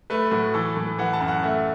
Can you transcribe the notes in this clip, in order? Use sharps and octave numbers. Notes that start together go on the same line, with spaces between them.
A3 B4
A2 F#4
E3 A4
A2
E3 F#5
A5
F#2
F#5
A3 E5